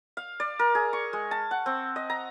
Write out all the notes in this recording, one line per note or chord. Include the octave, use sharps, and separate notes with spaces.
F5
D5
A#4
G#4
C#6
G#3
A5
F#5
C4
D#5
A#5